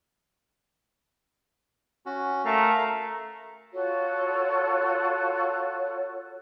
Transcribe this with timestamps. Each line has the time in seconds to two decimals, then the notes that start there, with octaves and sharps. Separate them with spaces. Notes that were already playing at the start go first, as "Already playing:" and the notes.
2.06 C#4 F#4
2.46 A3 A#4 F5 A#5
3.73 F4 F#4 A4 C#5